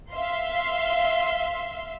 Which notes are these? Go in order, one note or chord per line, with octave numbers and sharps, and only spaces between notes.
E5 F5 C6